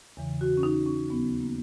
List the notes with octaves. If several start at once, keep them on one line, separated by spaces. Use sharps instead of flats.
E2 C#3 E3
F#4
C#4
D#4
C#4
D#2 C#3 F#3 B3
A#3